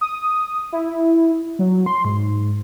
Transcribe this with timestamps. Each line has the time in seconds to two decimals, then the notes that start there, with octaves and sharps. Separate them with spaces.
0.01 D#6
0.73 E4
1.59 F#3
1.86 C6
2.05 G#2